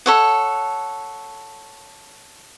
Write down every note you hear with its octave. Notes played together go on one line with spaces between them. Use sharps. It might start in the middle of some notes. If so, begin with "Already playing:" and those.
A4 C#5 F#5